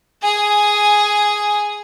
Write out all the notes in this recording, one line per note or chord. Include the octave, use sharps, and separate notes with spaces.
G#4 G#5